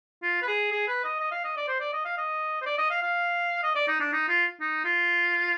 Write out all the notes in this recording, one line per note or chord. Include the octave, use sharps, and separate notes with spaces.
F4
B4
G#4
G#4
B4
D#5
D#5
F5
D#5
D5
C5
D5
D#5
F5
D#5
C5
D5
D#5
F5
F5
D#5
D5
D#4
D4
D#4
F4
D#4
F4